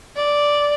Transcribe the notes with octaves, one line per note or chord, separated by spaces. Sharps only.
D5